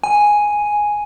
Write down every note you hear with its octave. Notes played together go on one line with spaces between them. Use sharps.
G#5